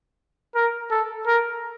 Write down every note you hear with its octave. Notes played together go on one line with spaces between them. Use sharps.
A#4
A4
A#4